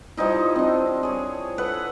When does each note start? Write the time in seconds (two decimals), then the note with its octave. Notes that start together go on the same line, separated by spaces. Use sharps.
0.17 F3 G3 D#4 E4
0.56 C4 D4
1.03 G#4 C#5
1.58 A4 B4 E5 F#5